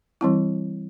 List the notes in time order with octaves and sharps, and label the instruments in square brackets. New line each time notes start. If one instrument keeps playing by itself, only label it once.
[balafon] E3 G3 C4 E4